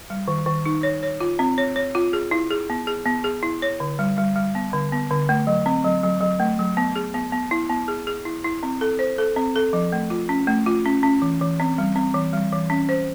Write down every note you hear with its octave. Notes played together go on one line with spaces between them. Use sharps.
G3
D#3
D#3
D#4
C#5
C#5
F4
C4
C#5
C#5
F4
G#4
E4
G#4
B3
G#4
B3
G#4
E4
C#5
D3
G3
G3
G3
B3
D3
B3
D3
A3
F#3
C4
F#3
F#3
F#3
A3
F#3
B3
G#4
B3
B3
E4
B3
G#4
G#4
E4
E4
C4
A4
C5
A4
C4
A4
F3
A3
F4
C#4
A3
F4
C#4
C#4
E3
E3
C4
G3
C4
E3
G3
E3
C#4
C5